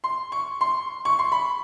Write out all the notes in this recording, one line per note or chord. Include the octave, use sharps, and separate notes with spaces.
C6
C#6
C6
C#6
C6
B5